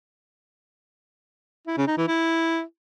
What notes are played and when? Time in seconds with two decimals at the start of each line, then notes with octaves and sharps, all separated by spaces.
1.67 E4
1.77 C#3
1.88 D#4
1.98 E3
2.08 E4